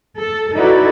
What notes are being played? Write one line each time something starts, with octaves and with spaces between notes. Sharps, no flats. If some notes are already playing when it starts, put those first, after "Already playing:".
A4
D#4 E4 F#4 A4 B4 D5